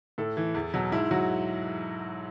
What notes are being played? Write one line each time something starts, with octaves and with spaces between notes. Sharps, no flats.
A2 A4
E3
E2
B2 F#3
G#2 E4
F#3 F#4